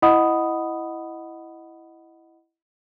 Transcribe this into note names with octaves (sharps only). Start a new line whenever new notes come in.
E4 D#5 F#5 B5 D#6